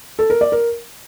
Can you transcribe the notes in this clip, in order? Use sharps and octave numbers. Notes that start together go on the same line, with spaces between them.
A4
A#4
D5
A#4